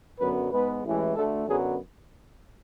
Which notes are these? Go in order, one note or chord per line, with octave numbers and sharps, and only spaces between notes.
F#2 D3 F#3 B3 B4
G#2 G#3 B3 B4
A1 A2 E3 G#3
D2 D3 A3 A4
F#2 D3 F#3 B3 G#4